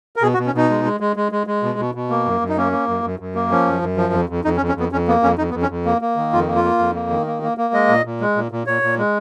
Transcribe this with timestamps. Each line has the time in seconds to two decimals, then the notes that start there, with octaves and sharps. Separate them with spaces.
0.16 A#4
0.22 B2 G#4
0.34 F#4
0.38 B2
0.46 C#4
0.54 B2 D#4
0.70 G#3
0.84 G#3
1.00 G#3
1.16 G#3
1.32 G#3
1.47 G#3
1.63 B2
1.79 B2
1.95 B2
2.10 A#3
2.25 F#2
2.41 F#2
2.49 D#4
2.57 A#3 C#4
2.72 A#3
2.88 F#2
3.04 F#2
3.19 F#2
3.35 A#3
3.51 F3 C#4
3.66 F#2
3.82 F#2
3.97 F3
4.13 F2
4.29 F2
4.44 F2 D#4
4.57 C#4
4.61 F2
4.68 C#4
4.75 F2 B3
4.92 F2 C#4
5.08 A#3 B3
5.23 F2 C#4
5.38 F2 D#4
5.50 B3
5.54 F2
5.62 C#4
5.69 F2
5.85 A#3
6.01 A#3
6.16 D#3
6.33 F2 F4
6.48 A#3
6.56 F4
6.64 A#3
6.79 F2
6.95 A#3
7.10 D#3
7.26 A#3
7.42 A#3
7.58 A#3
7.74 G#3 D#5
7.88 A#2
8.05 A#2
8.21 G#3
8.36 A#2
8.51 A#2
8.67 A#2 C#5
8.82 A#2
8.99 G#3